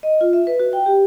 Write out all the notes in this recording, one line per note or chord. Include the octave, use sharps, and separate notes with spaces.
D#5
F4
E5
B4
F#4
G5
G4